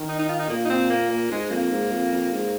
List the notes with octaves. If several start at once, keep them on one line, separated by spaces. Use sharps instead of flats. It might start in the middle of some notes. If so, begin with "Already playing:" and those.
Already playing: D#3
D#4
D#4
F4
D#4
A#2 A#3
D#4
C4
A#3
A#3
G#2 G#3
F2 A#3
G#2
F2
F2
G#2